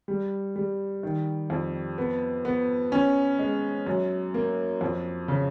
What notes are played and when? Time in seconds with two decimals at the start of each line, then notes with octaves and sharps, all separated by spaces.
0.08 G3
0.56 G3
1.03 D#3
1.50 F2
1.98 B3
2.45 B3
2.92 C#4
3.39 G#3
3.86 F#2
4.34 A#3
4.81 F2
5.28 C#3